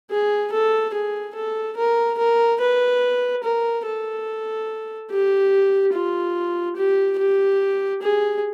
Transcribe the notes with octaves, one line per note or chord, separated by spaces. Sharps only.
G#4
A4
G#4
A4
A#4
A#4
B4
A#4
A4
G4
F4
G4
G4
G#4